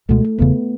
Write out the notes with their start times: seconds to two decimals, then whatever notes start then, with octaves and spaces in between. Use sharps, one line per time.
0.09 C#2 B2 G#3 A3
0.25 A3
0.39 E1 E2 C#3 B3